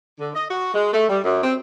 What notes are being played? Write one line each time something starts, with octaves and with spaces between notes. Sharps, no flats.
D3
D#5
F#4
G#3
A3
G3
F#2
C4